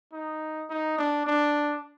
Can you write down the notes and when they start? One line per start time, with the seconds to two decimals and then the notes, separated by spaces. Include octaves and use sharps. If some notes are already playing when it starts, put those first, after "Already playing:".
0.13 D#4
0.70 D#4
0.98 D4
1.26 D4